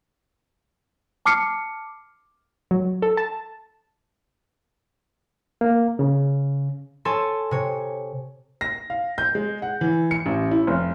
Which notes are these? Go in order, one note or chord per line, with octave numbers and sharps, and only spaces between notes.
A5 D6 F6 C7 C#7
F#3
A4
A5
A#3
C#3
A4 C#5 G#5 A5 C6
C3 C#5
A#6
F5
G6
G#3
F#5
E3
C#7
A1
E4
F1